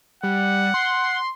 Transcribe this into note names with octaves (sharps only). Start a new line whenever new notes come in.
G3 F#5
C6